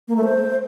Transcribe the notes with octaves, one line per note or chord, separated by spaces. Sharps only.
A#3
A3
C5